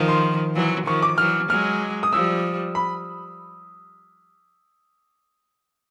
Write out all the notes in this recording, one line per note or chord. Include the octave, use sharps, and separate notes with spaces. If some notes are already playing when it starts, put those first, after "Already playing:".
Already playing: D#3 F3
C6
E3 F#3
D#3 F3 C#6
D6
E3 F#3 F6
F#3 G#3 F6
D#6
F3 G3 E6
B5